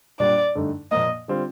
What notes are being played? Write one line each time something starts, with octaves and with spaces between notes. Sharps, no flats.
A#2 G3 D4 D5
G2 D3 A3 D#4
A#2 F3 A#3 D#5
D3 G3 C4 F4